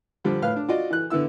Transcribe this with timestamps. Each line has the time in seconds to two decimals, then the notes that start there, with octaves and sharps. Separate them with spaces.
0.24 D3 F3 G3 D4
0.42 A2 B4 F5 F6
0.56 D4
0.69 F4 F#4 D5 D#5
0.90 E3 F#6
1.10 D3 B3 E4 E6